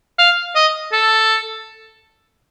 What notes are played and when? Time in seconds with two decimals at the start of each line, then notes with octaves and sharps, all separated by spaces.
0.19 F5
0.55 D#5
0.92 A4